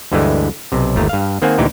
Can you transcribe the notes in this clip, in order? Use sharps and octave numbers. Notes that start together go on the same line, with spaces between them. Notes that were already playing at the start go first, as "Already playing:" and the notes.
D2 G2 D3 E3 G#3 A3
B1 C3
G1 D#2 A3 A#5
G2 F5
D#3 A#3 C4 C5 F#5 G#5
D2 A#2 E3 D#4 G4